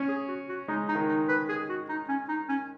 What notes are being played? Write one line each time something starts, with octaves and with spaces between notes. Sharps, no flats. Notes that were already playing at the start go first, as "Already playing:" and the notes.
Already playing: C#4
G#4
F#4
F#4
G#3 D#4
D#4
D#3
D#4
B4
G#4
F#4
D#4
C#4
D#4
C#4